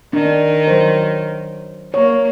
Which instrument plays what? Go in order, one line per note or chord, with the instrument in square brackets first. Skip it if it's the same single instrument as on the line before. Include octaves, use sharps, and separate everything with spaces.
[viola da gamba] D#3 [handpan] D4
[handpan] F#3 C5
[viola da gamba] A#3 [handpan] C#5